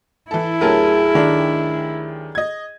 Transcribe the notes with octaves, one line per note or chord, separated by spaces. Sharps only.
E3 E4 A4
D2 F#3 G4 G#4 A#4 A5
D#3 D4
D#5 G#6